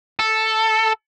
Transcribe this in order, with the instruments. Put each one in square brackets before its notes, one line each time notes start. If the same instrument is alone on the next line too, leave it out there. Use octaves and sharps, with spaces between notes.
[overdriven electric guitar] A4